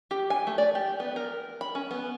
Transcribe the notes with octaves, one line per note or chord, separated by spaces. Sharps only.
G4
G#5
A3
D5
G4
B3
A#4
B5
C#4
B3